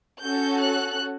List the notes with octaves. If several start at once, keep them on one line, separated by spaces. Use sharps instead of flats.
C#4 F#4 A4 G6
F#6